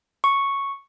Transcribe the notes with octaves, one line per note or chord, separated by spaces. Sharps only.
C#6